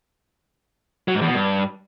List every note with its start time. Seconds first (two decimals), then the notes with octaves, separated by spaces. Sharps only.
1.08 F#3
1.15 G#2
1.21 E2
1.28 B2
1.34 G2